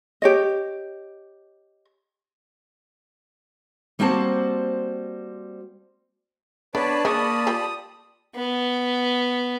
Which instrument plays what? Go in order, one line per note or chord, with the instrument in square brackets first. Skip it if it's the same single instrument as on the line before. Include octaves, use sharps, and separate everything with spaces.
[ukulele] G4 C#5 D#5
[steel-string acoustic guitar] G3 A#3 C4 F#4 C5 A5
[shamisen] B3 [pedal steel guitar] D4 [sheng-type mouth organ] B4 C#5 [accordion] D5 A5 B5
[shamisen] C#3 D4 [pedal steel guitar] A#3 C#6 [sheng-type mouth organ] D#6
[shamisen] F4 G4
[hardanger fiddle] B3